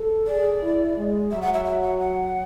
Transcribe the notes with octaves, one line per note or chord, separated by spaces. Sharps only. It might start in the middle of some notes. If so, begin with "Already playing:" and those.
Already playing: A4
G#4 D5
E4
G#3
F#3 E5
F#5
E5
E5
F#5
F#5